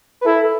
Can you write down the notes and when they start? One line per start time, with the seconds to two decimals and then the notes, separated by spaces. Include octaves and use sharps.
0.21 B4
0.26 E4 A4